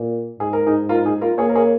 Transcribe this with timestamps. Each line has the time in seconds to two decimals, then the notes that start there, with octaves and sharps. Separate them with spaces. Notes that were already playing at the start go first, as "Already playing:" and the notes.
Already playing: A#2
0.40 G#2 G#4
0.53 A#4
0.67 D#4 G#4
0.89 F4 A#4
1.05 D#4 G#4
1.21 F4 A#4
1.38 A#3 G#4 C#5
1.49 A#4
1.55 G#4 C#5